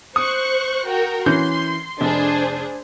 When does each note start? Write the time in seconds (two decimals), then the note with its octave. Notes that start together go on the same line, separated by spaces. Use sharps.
0.16 C5 C#6 D#6 F#6
0.87 F#4 A#4 G5
1.26 E3 C#4 C6 G6
2.01 F1 D4 G#4 C5